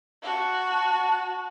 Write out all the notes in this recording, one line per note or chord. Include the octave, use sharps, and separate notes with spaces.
F#4 A5